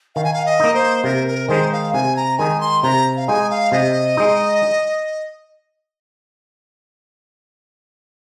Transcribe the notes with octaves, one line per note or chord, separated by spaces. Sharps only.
D#3 F5
G#5
F5
D#5
A#3 D#4
C5
C3 A#4
A#4
D#3 G#3 D#4 C5
F5
C3 G#5
A#5
D#3 G#3 D#4 G#5
C6
C3 A#5
F5
G#3 D#4 G#5
F5
C3 D#5
G#3 D#4